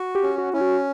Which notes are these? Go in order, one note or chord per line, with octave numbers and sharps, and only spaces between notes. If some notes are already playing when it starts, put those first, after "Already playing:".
Already playing: F#4
G4
C#4
F#4
C#4 E4
F#4